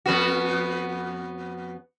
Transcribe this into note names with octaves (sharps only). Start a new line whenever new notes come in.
F2 B3 F#4